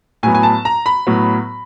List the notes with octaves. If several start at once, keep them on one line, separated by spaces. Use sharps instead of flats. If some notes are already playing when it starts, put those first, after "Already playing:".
A2 F#3 B3 G#5
G#5
A5
A#5
B5
A2 F#3 B3